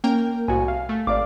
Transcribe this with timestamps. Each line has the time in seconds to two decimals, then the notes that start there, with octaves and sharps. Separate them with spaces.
0.04 A#3 C#4 A#4 G5
0.48 C2 A2 F#4 G#5
0.68 F5
0.89 A3
1.07 G#1 D5 F5 D6